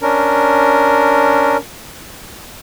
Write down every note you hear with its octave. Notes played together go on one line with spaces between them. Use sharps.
C#4 D4 A#4